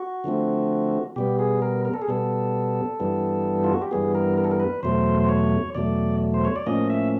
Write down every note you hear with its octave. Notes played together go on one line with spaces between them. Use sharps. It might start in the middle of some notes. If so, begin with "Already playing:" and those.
Already playing: F#4
D3 F3 A3 C4
B2 G3 B3 G4
G#4
A#4
A#4
A4
G#4
B2 G3 B3 A4
G2 E3 G3 B3
F4
F#4
G4
G2 E3 G3 B3 G#4
A#4
A#4
A4
A#4
B4
E2 B2 F#3 A3 C5
C5
C#5
E2 B2 F#3 A3 D5
C5
C#5
D5
A2 F3 A#3 C#4 D#5
E5